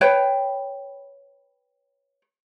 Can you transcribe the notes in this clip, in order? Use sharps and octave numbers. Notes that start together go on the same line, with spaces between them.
B4 C#5 G5